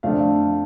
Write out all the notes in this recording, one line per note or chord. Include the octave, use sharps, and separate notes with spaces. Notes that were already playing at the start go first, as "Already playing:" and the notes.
F2 D3 A3 D4 F5